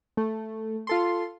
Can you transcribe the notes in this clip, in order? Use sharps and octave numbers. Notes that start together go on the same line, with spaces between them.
A3
F4 A4 C6